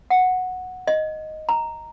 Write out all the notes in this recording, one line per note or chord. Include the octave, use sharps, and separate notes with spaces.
F#5
D#5
A#5